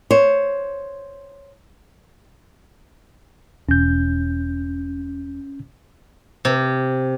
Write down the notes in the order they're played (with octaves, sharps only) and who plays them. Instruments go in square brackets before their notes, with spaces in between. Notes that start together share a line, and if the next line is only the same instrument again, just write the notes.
[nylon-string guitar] C5 C#5
[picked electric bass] E1 [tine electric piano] C#4 G6
[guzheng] C3